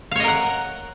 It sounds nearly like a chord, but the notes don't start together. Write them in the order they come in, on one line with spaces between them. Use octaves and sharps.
F5 C#5 D#5 A#4 F#5